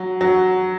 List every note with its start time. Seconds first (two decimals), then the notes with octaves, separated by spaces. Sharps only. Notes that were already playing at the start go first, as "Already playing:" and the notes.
Already playing: F#3
0.21 F#3